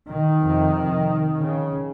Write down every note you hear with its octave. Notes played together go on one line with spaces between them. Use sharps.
D#3
F2 C3
C#3